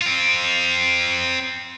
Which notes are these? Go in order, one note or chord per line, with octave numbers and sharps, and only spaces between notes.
C4 F4